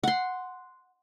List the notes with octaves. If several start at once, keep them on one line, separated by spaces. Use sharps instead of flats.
F#5 C6